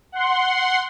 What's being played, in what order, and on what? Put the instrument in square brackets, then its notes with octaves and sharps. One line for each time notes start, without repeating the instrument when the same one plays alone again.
[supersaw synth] F#5 C6